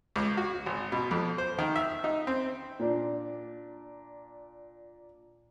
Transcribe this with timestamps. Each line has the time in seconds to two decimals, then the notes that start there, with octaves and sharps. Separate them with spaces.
0.16 C#2
0.37 F#4
0.66 G#1
0.92 B2
1.11 F2
1.38 C5
1.59 D#3
1.76 E5
2.04 D#4
2.27 C4
2.79 A#2 D4